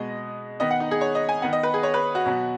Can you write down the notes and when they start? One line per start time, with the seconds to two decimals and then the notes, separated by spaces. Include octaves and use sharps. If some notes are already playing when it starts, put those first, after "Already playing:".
Already playing: B2 G#3 B3 D#5
0.60 D#3 B3 D#5
0.71 F#5
0.80 D#4
0.91 G#4
1.01 C#5
1.15 D#5
1.29 G#5
1.42 D#3 B3 F#5
1.53 D#5
1.63 B4
1.74 G#4
1.83 C#5
1.94 B4
2.15 F#4
2.26 B2 F#3 B3